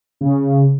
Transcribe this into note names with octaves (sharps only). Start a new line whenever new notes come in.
C#3